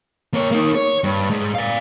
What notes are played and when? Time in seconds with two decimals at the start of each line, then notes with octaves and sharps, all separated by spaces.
0.34 A#3 C#5
0.51 A#3 D#4
0.75 C#5
1.04 G2
1.31 G#2
1.55 D5 F5